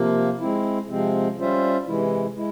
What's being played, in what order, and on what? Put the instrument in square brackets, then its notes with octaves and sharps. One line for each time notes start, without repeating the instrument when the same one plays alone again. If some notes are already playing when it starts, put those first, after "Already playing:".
Already playing: [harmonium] C3 F3 A#3
G#3 C4 E4
C3 F3 G#3 C4
G3 C#4 F4 C5 E5
C3 E3 G#3 E4
G#3 E4